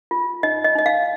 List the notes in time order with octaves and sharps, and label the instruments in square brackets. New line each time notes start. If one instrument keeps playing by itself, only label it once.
[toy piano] F4
D#4 D#5
D#5
D#4 D#5
F5